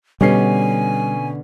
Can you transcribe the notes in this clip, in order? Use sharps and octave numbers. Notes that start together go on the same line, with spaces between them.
B2 D3 G3 B3 C#4 G#5 C7